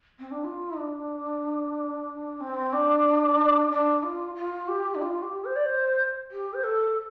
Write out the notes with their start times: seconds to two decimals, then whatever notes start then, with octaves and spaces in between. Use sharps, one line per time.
0.19 C4
0.31 D4
0.44 F4
0.77 D4
2.40 C4
2.73 D4
3.70 D4
4.03 F4
4.35 F4
4.68 G4
4.94 D4
5.01 F4
5.22 G4
5.44 C5
5.55 D5
5.65 C5
6.31 G4
6.53 C5
6.63 A4